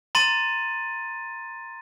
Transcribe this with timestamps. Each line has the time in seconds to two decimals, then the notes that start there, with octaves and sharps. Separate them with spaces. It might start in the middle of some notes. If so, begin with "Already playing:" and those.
0.15 A#5 C6 A6 D#7